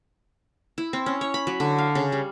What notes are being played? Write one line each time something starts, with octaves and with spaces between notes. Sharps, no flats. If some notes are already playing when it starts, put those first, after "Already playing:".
E4
C4
C#4
C#5
B5
F#3
D3
F5
C#3
G3